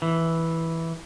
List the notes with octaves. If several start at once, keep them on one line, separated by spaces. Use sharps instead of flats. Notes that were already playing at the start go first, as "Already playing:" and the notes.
E3